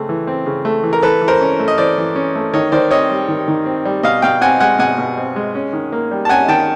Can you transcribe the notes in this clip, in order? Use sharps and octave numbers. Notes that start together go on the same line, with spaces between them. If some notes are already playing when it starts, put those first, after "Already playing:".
Already playing: C#3 A3 C4
E3
C4
C#3
A3
E3
A#4
E3 A4 B4
E3
A#4 C5
C#4
A3
D#5
E3 C5 D5
E3
C#4
A3
D#3 C#5 D#5
D#3 C5 D5
C4 C#5 D#5
G3
D#3
D#3
C4
G3
B2 D#5 F5
B2 F5 G5
C4 F#5 G#5
G#3 F#5 G#5
B2 F#5 G#5
B2
C4
G#3
C#4
D#3
A#3
G3
A5
C#4 F#5 G#5
D#3 G5 A5